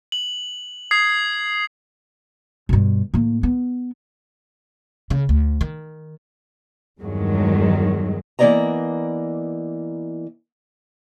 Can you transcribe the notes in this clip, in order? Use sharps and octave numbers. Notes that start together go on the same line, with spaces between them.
F#7
D#6 G#6 C7
G2 B2
A2 A#3
B3
C#3
D2
D#3
E2 G2 D#3 F#3 G#3
E3 A#3 B3 D5 D#5 A#5